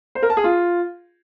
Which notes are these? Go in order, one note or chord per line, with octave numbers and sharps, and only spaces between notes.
C5
A#4
A5
G#4
F4